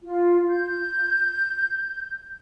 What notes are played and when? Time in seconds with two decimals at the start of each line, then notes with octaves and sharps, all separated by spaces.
0.03 F4
0.50 G6